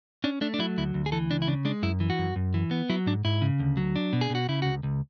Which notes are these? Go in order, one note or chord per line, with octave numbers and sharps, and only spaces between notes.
C#4 D4
A3 D4
D4
F#3 E4
D2 E4
D2
G#4
E3 A4
C#2 D4
E4
C#3 D4
G#3 D4
F#2 E4
E3
F#4
F#2
F#2
E3
B3
F#3 E4
G#2 D4
G#2 E4
C#3
D2
F#3
D4
B2
G#4
B2 F#4
C#3 E4
C#2 F#4
C#2